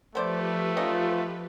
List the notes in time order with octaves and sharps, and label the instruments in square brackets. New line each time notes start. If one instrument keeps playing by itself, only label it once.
[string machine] F3 G4 B4 [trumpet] A3 [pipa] B3 C5 D5
[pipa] C#4 D#4 D#5 [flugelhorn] F4